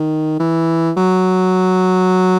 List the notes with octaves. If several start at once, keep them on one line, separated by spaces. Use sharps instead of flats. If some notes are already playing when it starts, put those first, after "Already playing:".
Already playing: D#3
E3
F#3